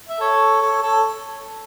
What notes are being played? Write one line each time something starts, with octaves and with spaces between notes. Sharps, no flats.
E5
A4 C#5
A4 C#5
A4 C#5